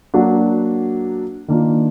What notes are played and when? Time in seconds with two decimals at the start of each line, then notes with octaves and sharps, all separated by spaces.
0.14 F#3 A#3 D4 F#4
1.48 D#3 A#3 D4 F4